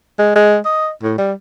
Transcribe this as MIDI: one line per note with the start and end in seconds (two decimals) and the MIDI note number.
0.19 0.34 56
0.36 0.57 56
0.65 0.90 75
1.03 1.15 45
1.18 1.33 55